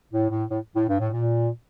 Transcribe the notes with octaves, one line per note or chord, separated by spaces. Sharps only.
A2
A2
A2
A2
G2
A2
A#2